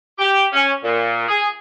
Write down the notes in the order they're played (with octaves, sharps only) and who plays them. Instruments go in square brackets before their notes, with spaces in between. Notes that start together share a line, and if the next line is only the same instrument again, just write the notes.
[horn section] G4
C#4
A#2
G#4